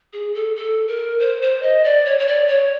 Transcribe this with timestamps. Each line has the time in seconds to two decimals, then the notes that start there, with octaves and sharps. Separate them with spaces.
0.13 G#4
0.34 A4
0.56 A4
0.88 A#4
1.20 C5
1.42 C5
1.63 D#5
1.84 D5
2.05 C#5
2.19 C#5
2.27 D5
2.48 C#5